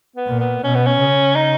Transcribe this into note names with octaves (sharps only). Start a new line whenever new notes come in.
B3
A#2
B3
B2 C#4
B3
C#4
C#3
D#4